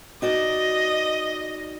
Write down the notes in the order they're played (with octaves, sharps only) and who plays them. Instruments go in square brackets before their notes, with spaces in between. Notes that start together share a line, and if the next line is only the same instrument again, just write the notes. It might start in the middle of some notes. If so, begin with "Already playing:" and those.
[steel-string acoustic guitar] D#4 F#4 D5 [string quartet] D#5